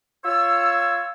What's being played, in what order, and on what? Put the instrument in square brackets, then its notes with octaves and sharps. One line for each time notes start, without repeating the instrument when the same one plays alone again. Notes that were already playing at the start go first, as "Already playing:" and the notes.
[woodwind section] F4 C#5 E6